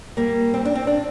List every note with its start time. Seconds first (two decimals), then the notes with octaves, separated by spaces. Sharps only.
0.17 G3 A#3
0.54 C4
0.65 D4
0.75 C4
0.87 D4